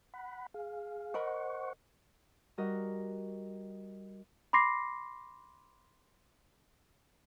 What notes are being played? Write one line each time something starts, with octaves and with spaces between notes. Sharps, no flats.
F#5 B5
G#4 F5
A#4 C5 D#5 F#5 B5 C#6
G3 F#4 A#4 D#5
B5 C6 D6 A#6 C7